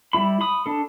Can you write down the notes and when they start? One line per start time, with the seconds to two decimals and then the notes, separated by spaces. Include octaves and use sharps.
0.13 G3 A#3 E4 B5
0.41 B5 D#6
0.66 D4 A4